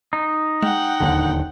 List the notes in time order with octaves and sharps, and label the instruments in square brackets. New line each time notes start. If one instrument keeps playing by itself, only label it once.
[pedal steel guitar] D#4
[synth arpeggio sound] G#3 [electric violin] F#5 G5
[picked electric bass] D1 D#2 D3